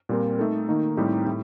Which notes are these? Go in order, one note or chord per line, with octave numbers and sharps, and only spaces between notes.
A#2 G3 C4 F4 A#4
A3 D#4 A4
D#3 A#3 D#4
A2 G3 C4 D#4 G4
A2